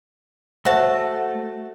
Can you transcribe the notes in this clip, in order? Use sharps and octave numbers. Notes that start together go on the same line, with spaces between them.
A3 F#4 C5 E5 F5 A5